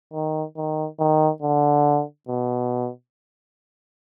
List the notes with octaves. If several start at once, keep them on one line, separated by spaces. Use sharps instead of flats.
D#3
D#3
D#3
D3
B2